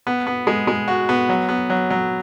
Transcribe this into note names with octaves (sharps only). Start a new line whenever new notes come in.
B3
B3
G#3
G#3
F#4
B3
F#3
B3
F#3
F#3